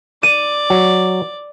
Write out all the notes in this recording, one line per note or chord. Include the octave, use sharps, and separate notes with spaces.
D5 D#7
F#3